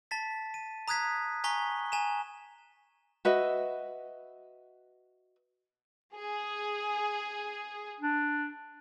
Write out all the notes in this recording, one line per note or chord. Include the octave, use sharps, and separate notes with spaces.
A5 A6 B6
D#7
A#5 D#6 F#6 G#6 B6
G#5 A#5 C#6 B6 G7
G#5 A#5 E7
F#4 B4 D#5 E5
G#4
D4